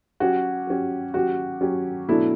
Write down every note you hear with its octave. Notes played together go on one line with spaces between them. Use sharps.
F#3 C#4 F#4 G4
F#3 C#4 G4
F#3 C#4 F#4 G4
F#3 C#4 G4
B2 F#3 A3 D4 E4